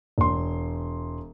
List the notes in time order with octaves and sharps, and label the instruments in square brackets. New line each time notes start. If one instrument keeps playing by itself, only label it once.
[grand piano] E1 C6